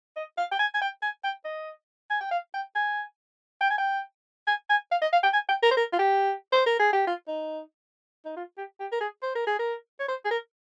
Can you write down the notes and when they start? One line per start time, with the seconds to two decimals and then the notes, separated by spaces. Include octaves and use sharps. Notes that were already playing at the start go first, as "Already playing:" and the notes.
0.16 D#5
0.37 F5
0.52 G5
0.59 G#5
0.74 G#5
0.81 G5
1.02 G#5
1.24 G5
1.45 D#5
2.10 G#5
2.21 G5
2.31 F5
2.54 G5
2.76 G#5
3.61 G5
3.70 G#5
3.78 G5
4.47 G#5
4.70 G#5
4.91 F5
5.02 D#5
5.13 F5
5.23 G5
5.33 G#5
5.49 G5
5.63 A#4
5.71 C5
5.77 A#4
5.93 F4
5.99 G4
6.52 C5
6.66 A#4
6.79 G#4
6.93 G4
7.07 F4
7.28 D#4
8.25 D#4
8.37 F4
8.57 G4
8.80 G4
8.92 A#4
9.00 G#4
9.22 C5
9.35 A#4
9.47 G#4
9.59 A#4
10.00 C#5
10.08 C5
10.25 G#4
10.31 A#4